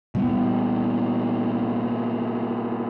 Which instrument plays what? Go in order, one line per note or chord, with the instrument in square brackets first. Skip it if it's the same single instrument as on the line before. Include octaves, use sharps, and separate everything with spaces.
[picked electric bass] A#2 G3 B3